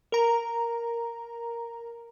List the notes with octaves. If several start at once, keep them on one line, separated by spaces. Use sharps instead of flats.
A#4 A#5